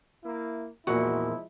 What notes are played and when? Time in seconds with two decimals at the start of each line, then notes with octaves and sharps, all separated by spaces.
0.24 A#3 E4
0.87 E2 A#2 F3 G#3 E4 F#4